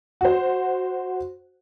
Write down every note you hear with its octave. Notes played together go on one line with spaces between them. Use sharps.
F#4 C5